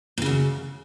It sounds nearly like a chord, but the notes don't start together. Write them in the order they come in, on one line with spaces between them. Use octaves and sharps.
A#2 C#3 F#2